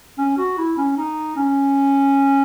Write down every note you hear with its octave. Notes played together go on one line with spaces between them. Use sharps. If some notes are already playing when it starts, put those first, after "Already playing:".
C#4
F#4
E4
C#4
D#4
C#4